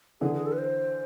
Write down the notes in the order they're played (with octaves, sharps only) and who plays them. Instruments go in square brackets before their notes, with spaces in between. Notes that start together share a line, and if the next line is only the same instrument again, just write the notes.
[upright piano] D3 E3 [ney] G#4
[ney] G#4
A4
B4
C5